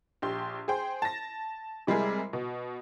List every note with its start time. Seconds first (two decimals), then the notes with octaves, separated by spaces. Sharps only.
0.22 A#1 G4 C6
0.68 G#4 C5 G5 C6
1.02 A5 A6 A#6
1.87 C3 G3 G#3 E4 G#4 A#4
2.33 B2